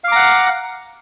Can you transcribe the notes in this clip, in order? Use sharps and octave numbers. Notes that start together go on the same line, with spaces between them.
F5 F#5 A#5 D6